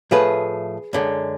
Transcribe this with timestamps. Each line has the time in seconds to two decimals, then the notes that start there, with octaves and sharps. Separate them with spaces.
0.11 A2 F3 A3 G#4 B4
0.93 F#2 D3 G#3